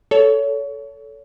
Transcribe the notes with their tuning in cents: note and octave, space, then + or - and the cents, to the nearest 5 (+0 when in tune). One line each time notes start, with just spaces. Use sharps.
A4 +0 C#5 +25